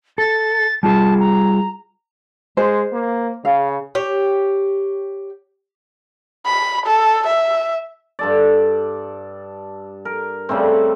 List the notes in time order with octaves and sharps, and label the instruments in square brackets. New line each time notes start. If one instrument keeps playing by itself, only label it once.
[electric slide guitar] A4 [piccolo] A6
[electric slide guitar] G3 F4 G#4 [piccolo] A5
[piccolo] A#5
[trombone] G#3 [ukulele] C5
[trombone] A#3
[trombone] C#3 [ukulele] F5
[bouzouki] G4 C#5
[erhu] B5
A4
E5
[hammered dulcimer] G2 A4 D5
A#4
C#3 G3 A3 C4